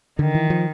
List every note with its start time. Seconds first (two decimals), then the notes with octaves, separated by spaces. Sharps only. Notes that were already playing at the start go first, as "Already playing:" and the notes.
0.19 D3 D#3
0.35 E3
0.50 F3